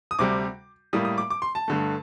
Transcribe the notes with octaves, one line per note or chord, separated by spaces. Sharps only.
D#6
D2 C3 G3 D6
A2 G3 A#3 D#6
D#6
D6
D6
C6
A5
G2 D3 A3